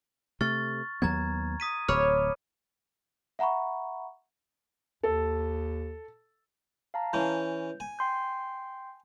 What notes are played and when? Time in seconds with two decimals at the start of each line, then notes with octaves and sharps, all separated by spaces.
0.41 C3 A3 C#6 F6 A6
1.02 D#2 F#3 B3 A#5 G#6
1.60 D#6 B6 D#7
1.88 D1 C#5 B5 D6 F6
3.39 E5 F#5 A#5 B5 C#6
5.03 D#2 A4
6.94 F5 A5 A#5
7.13 E3 C#4 G6
7.80 G#5
7.99 G5 C6 G6